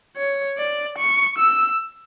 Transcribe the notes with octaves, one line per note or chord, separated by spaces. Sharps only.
C#5
D5
C#6
E6